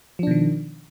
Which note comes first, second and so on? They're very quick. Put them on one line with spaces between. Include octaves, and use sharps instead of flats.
F3 D4 B2 D#3